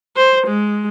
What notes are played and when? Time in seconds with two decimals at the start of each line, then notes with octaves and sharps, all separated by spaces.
0.16 C5
0.48 G#3